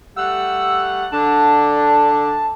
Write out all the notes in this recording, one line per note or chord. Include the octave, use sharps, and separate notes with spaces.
G3 A3 F#5 E6
D3 D4 A5